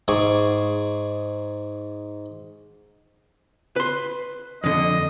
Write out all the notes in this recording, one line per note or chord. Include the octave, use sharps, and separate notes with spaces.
G#2 G#4 C#6 D6
B4 C6
F2 D3 D#5